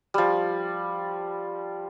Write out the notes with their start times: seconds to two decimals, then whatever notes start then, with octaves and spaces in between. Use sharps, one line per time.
0.14 F3 G3